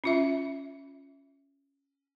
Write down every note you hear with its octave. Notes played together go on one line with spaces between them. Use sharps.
C#4 F4 E5